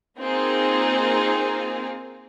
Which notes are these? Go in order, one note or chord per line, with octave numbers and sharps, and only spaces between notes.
A#3 C4 D#4 F4 G#4